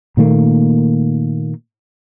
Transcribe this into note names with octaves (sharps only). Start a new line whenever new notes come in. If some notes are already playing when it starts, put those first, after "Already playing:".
A#2 D#3 A3 A#3